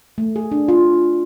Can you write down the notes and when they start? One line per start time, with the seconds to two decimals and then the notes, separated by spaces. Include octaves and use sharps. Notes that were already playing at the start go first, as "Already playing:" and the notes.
0.18 A3
0.36 G#4
0.51 D4
0.68 F4